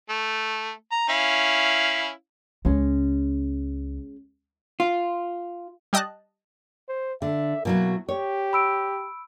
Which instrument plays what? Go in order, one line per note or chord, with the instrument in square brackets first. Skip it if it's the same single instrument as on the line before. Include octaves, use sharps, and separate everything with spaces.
[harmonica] A3
A#5
C#4 E4 F5
[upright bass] C#2 [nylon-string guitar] G#3 C#4
[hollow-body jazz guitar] F4
[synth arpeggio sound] G3 G4 D#5 G5 A5 F#6
[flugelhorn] C5
[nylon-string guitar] D3 [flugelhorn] E5
[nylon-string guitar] B2 F#3 E4 [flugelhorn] A#3
[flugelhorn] G4 [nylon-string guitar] C#5
[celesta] B5 E6 D7